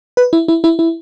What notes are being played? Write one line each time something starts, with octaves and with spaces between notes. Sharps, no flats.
B4
E4
E4
E4
E4